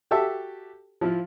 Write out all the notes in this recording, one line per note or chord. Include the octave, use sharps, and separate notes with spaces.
F#4 G4 A4 E5
F3 E4 F4